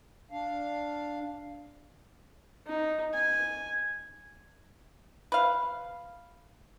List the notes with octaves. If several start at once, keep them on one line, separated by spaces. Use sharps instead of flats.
D4 F5
D#4
G#5
B4 F5